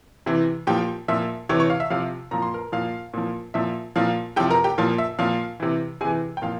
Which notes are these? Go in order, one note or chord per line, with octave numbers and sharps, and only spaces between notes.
C3 E3
A#2 F3 G4 G5
A#2 F3 E5
C3 E3 C#5 C#6
C#5 C#6
F5
E5
C3 F3 F5
A#2 F3 A#5
C6
A#4 A#5
A#2 F3 F5
A#2 F3
A#2 F3 E5
A#2 F3 F5
C3 F3 G4 G5
A#4 A#5
G4 G5
A#2 F3 F5
E5
A#2 F3 F5
C3 E3
C3 E3 G#4 G#5
G5
A#2 F3 F5